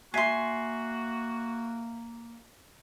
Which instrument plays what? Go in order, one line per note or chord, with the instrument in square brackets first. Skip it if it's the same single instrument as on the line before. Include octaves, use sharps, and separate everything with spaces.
[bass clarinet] A#3 [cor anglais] F#4 [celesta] E5 B6 C7 [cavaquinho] G#5 C6